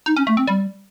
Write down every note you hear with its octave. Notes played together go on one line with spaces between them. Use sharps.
D#4
C#4
A3
C4
G3